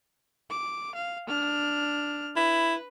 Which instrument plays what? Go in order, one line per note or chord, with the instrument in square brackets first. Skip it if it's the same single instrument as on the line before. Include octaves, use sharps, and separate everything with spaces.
[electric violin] D6
F5
D4 F6
[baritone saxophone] E4 [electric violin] B4